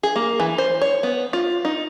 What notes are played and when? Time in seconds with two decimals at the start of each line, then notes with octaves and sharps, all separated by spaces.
0.03 G#4
0.16 A#3
0.40 E3
0.58 C5
0.82 C#5
1.03 B3
1.33 F4
1.65 D#4